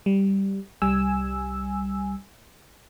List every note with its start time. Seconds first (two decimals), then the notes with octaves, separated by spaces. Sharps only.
0.06 G3
0.82 C2 G3 G#5 E6